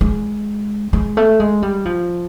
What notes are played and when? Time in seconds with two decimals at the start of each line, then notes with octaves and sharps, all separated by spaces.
0.01 G#3
0.93 G#3
1.17 A3
1.40 G#3
1.62 G3
1.85 F3